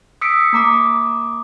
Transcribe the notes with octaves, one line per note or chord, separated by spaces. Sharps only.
D#6 E6 B6 C#7 D7
A#3 A#5 D6 D#6